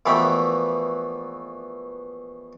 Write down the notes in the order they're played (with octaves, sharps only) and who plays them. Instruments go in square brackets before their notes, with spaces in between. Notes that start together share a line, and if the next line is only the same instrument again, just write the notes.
[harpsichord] A#1 B2 E3 A3 G5 B5